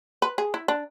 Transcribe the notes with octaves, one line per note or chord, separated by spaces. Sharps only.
B4
G#4
E4
D4